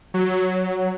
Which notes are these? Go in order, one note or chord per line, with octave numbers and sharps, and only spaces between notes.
F#3